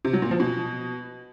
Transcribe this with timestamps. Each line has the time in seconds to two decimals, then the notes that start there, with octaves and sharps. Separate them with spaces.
0.05 C3
0.13 F#3
0.22 A#2
0.31 F3
0.40 B2